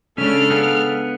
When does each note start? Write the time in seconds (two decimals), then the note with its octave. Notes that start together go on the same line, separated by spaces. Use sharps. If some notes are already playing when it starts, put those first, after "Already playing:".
0.18 C#3 G#3 C#4 D4 A4 F6
0.51 B3 G#4 F5